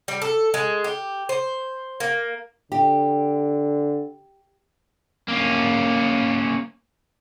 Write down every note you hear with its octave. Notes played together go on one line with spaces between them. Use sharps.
G3
A4
G#3
G4
C5
A#3
D3 G4
A#3 C#4